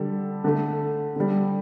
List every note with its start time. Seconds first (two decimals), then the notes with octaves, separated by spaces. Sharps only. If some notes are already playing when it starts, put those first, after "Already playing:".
Already playing: D3 G3 A4
0.44 D3 A3
1.16 D3 G3